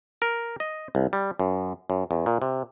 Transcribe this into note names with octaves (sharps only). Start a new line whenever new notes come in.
A#4
D#5
C2
G3
F#2
F#2
E2
A#2
C3